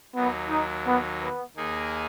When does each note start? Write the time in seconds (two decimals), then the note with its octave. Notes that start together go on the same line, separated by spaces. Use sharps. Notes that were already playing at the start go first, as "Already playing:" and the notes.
0.15 D#2 D#3 F#3 B3
0.50 D#4
0.86 B3
1.21 B3
1.56 D#2 D#3 A#3 D#4 G#4